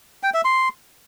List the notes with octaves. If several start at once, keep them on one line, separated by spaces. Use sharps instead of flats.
G5
E5
C6